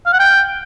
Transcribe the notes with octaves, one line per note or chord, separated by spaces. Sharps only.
F5
F#5
G5